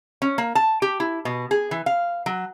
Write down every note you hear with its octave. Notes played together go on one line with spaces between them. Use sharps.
C#4
A#3
A5
G4
E4
B2
G#4
E3
F5
F#3